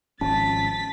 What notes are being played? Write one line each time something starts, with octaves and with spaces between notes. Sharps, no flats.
G#1 F3 C#4 A5 A6 B6